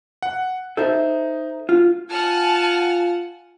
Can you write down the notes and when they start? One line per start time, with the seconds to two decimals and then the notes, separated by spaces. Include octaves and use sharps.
0.22 F#5
0.77 D#4 A4 C5 E5
1.69 F4
2.10 F4 F#5 G#5 A5 F6